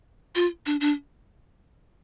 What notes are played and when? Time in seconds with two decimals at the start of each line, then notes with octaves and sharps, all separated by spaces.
0.35 F4
0.66 D4
0.81 D4